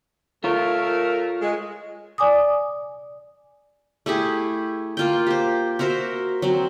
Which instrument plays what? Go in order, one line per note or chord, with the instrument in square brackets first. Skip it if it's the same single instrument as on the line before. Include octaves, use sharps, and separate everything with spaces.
[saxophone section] A3 A#4 [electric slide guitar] F4 C#5
[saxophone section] G#3
[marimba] D5 G#5 D6 D#6
[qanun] A3 E4 G4 G#4
A#3 F4 G5
G4 C5
F#4 A#4 C5 E5
F#3 C4